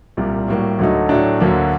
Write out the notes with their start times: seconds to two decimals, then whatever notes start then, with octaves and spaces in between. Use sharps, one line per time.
0.17 C2 A#2 G3
0.48 A2 G3 A#3 F#4
0.79 D2 D3 F#3 A3 D#4
1.09 A2 F#3 A3 D4
1.40 D2 D3 F#3 A#3